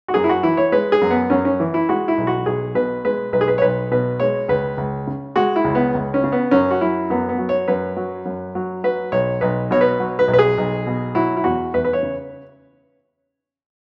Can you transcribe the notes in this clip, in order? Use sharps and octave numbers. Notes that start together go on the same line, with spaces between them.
F#4
F#2 G#4
E4
F#4
E3 E4
C#5
G#3 B4
G#4
F#2
B3
F#2 C#4
C#4
E3
E4
G#3 F#4
E4
B1
F#4
B1 G#4
B2 B4
G#3 B4
B1 B4
G#4
B4
C#5
B1 B4
B2 B4
G#3 C#5
C#2 B4
C#2
C#3
G#3 F#4
E4
C#2
B3
C#2
C#4
C#3
B3
F#2 C#4
F#4
F#3 E4
F#2 B3
B3
F#3
C#5
F#2 B4
F#3
F#2
F#3
F#3 B4
B1 C#5
B1 B4
B2 C#5
B4
F#3
B4
B1
B4
G#4
B1
B2
F#3 E4
E4
E2 F#4
E2 B4
B4
C#5
C#3